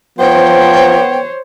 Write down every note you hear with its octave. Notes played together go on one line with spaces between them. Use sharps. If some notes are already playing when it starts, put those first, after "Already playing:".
F3 B3 C5 C#5 G5